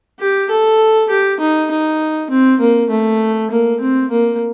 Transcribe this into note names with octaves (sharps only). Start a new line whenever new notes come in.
G4
A4
G4
D#4
D#4
C4
A#3
A3
A#3
C4
A#3